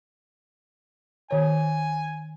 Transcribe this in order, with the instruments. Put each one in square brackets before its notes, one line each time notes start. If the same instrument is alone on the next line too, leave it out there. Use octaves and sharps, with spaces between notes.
[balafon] D#3 C#5 [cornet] G#5